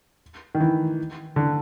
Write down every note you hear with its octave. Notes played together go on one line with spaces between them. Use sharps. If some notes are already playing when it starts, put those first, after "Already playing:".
D#3
E3
D3